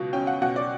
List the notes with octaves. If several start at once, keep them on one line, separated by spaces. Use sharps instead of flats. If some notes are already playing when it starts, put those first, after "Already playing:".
Already playing: C#2 B2 F#3
C#4 G5
F#5
B2 F#5
D5